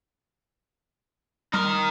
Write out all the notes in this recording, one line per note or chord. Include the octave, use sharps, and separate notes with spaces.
G3 D#4 A#4 A#5 F6